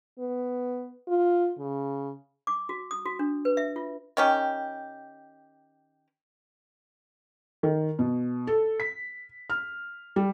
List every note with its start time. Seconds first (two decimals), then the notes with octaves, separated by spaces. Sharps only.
0.19 B3
1.08 F4
1.58 C#3
2.47 D6
2.69 F#4
2.91 D#6
3.06 F#4
3.19 D4
3.45 B4
3.57 E5
3.76 F4
4.17 D#3 C#4 G4
7.63 D#3
7.99 B2
8.47 A4
8.80 B6
9.50 F6
10.16 G3